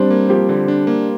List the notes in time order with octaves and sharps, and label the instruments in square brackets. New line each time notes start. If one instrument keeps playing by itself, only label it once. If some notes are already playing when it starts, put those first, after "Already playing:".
Already playing: [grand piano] G3 C4 [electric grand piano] D4
[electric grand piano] A#3
[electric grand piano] F3 [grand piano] G4 C5
[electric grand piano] D3
D4
A#3